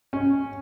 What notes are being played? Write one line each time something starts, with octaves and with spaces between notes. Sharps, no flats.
C#4